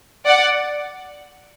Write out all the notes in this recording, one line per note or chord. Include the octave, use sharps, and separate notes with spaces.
D5 F#5